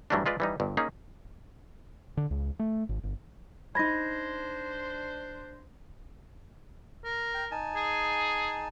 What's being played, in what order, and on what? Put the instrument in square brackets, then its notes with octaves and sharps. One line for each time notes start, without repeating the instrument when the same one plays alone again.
[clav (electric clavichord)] G2 E3 F#3 G3 A3 D4
G#3 F4 B4 D5
E3 G3 D#4
G1 G2
A#3 C#4 D#4 G#4
[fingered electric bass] D3
C#2
A3
G#1
G1
[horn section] D4 C5 [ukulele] D#4 B5 [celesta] G#6 A#6
[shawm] A#4
[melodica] G5
D#4 G#5 A5
[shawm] G#4